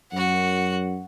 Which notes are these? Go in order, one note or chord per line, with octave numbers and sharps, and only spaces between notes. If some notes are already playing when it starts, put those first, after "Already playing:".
F#2 F#4 F#5